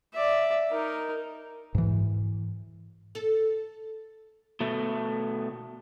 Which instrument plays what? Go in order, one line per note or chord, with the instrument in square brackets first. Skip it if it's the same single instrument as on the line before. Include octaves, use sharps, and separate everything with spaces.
[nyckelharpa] D5 E5
D#4 A#4
[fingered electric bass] G#2 E3
[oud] A4
[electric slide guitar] B2 A3